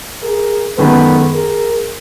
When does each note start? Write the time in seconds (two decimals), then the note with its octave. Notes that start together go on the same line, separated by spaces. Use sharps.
0.22 G#4 A#4
0.78 F#2 D#3 G#3 B3 A4 B4
1.34 G#4 A#4